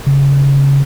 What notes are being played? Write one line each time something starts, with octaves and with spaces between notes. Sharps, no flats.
C#3